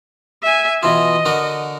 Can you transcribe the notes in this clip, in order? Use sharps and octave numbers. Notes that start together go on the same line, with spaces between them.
E5 G#5
B2 E3 F4 D#5
D3 F#4 A#4